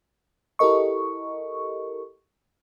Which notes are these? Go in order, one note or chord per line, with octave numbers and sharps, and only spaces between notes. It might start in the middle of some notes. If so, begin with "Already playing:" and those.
E4 G4 A4 A#4 D#5 C#6